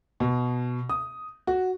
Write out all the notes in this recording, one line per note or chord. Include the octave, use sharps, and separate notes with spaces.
B2
D#6
F#4